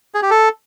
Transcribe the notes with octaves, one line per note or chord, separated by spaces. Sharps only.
G#4
G4
A4